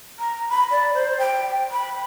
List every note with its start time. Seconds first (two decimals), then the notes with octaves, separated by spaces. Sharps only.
0.19 A#5
0.50 B5
0.71 D5
0.94 C5
1.18 G5
1.71 B5